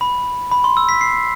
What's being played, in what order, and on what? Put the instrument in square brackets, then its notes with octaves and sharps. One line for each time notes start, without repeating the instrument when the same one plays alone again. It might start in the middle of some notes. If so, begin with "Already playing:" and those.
[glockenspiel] B5
B5
C6
E6
B6
C7